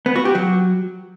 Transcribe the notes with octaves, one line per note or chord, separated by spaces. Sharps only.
B3
F#4
G4
F#3